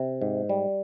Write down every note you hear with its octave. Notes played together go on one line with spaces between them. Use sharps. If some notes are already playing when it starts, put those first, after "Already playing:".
Already playing: C3
G#2
G3